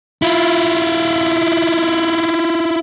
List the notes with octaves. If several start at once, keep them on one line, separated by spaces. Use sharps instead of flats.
E4 F4